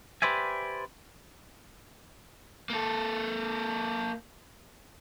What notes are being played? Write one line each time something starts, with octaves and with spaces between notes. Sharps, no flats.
G4 B4 C5 D5 E5 G#5
A#3 A4